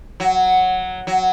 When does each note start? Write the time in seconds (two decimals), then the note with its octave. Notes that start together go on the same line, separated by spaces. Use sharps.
0.20 F#3
1.07 F#3